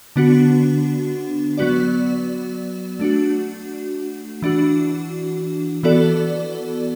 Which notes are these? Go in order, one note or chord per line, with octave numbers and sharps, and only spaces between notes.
D3 B3 D4 F#4
F#3 B3 F#4 D5
A3 D4 F#4
E3 D4 F#4
E3 B3 F#4 A4 D5